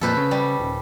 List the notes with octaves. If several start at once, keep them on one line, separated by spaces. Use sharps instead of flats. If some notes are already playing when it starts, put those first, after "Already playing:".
F2 A#2 A4 B4 C5
C#3
G3
D#1